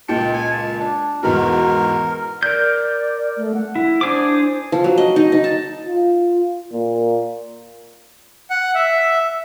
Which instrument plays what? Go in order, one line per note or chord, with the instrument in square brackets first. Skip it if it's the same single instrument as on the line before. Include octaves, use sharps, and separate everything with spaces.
[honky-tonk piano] C#2 A#2 C#7 [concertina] G5 A5
[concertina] G#5
A5
D4
[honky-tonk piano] E2 G#2 B2 [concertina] A#4
[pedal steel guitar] A#4 G6 [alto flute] D5
[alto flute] A3
F#5
[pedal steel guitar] E4
[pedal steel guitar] D4 G#4 D6 [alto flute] C5
[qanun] F3
F#3
D#5
D#4
D#4
A5
[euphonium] F4
A#2
[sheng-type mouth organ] F#5
E5